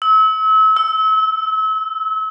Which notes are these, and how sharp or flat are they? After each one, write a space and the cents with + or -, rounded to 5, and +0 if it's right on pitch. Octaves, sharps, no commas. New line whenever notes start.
E6 -35
E6 -10